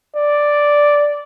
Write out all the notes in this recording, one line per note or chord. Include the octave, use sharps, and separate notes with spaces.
D5